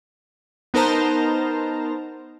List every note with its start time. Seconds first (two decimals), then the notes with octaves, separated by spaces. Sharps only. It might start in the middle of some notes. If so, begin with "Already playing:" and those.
0.74 B3 D#4 A#4 C5 A5 A#5